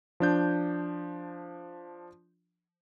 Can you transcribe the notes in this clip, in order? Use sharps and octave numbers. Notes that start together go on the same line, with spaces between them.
F3 D4 G6